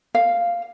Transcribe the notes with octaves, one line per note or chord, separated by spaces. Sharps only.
F5